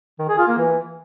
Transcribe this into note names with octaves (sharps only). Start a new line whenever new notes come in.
D#3
G#4
F4
A#3
E3